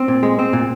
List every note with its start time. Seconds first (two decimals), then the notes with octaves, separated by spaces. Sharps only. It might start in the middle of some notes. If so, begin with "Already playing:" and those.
Already playing: C4
0.08 A#2
0.23 G#3
0.39 C4
0.53 A#2